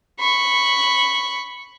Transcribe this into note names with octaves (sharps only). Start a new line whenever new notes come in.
B5 C#6